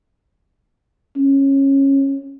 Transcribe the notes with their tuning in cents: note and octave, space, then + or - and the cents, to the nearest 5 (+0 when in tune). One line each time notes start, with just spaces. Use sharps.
C#4 -20